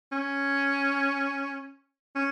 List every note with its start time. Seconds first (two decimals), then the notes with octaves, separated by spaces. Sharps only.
0.12 C#4
2.15 C#4